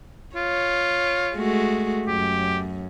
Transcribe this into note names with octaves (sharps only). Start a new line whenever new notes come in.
F4 C#5
G#3 A3 F#4
F#2 G4